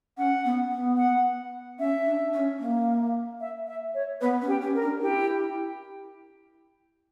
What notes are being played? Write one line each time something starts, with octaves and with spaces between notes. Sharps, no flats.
C#4 F#5
B3
B3
F#5
C#4 E5
D4
C#4
A#3
E5
E5
C#5
B3 B4
C#4
G4
C#4
A#4
D4
E4 G4